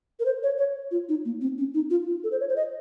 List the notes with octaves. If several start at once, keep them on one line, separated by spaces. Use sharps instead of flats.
A#4
C5
C#5
C#5
F4
D#4
A#3
C4
C#4
D#4
F4
F4
A4
C5
C#5
C5
D#5